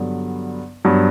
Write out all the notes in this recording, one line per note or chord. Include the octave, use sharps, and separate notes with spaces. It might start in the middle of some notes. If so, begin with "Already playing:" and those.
Already playing: G2 D3 F#3 B3
G2 F#3 B3 D4